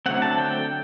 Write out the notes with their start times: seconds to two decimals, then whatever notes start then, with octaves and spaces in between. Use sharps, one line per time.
0.06 D3 F#3 A3 C4 F#5
0.22 A5
0.38 G5